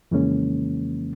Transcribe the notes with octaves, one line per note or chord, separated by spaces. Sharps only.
F2 C#3 E3 G#3 A#3 C#4